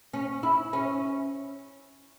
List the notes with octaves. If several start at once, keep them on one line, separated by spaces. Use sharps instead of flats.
C#4
E4
C#4